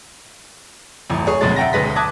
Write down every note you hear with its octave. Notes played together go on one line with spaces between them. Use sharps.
D1 G1 E2
G#4 C#5
F1 D2 B2 F#3 G#3 A6
E5 F#5 G5 A#5 A#6
D1 D2 G#3 B4 A#6 B6
A5 D6 D#6 F#6 G#6